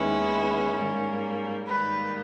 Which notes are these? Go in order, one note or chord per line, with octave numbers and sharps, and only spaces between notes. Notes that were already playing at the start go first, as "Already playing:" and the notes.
Already playing: D#2 D#3 G#3 B3 C#4 E4
G#2 G3 A#3
G#2 D#3 G3 A#3 B4